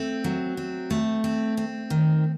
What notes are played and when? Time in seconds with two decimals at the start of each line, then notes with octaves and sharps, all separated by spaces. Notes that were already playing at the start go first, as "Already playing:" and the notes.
Already playing: A3 C4
0.24 F#3
0.57 C4
0.91 A3
1.24 C4
1.57 C4
1.90 D#3